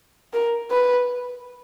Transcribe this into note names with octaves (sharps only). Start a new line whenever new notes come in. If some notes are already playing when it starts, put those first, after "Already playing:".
A#4
B4